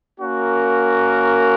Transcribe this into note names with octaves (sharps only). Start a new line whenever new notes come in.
A#3 C#4 F#4 A#4